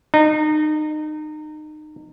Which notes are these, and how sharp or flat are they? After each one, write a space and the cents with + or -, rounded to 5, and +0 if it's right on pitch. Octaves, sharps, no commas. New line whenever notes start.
D#4 -30